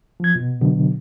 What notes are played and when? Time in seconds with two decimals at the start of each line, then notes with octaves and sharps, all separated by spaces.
0.20 F3 G#6
0.35 B2
0.61 B2 D3 F#3